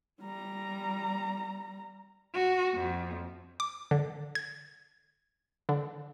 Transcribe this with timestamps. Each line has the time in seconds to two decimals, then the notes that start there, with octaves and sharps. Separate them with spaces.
0.21 G3 A#5
2.33 F#4
2.73 F2
3.60 D6
3.91 D3
4.35 G#6
5.69 D3